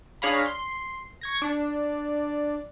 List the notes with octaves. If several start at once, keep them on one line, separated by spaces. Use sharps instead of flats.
D4 G#4 C#5 F5 A#5 B5
C6
C#6 G#6 A#6
D4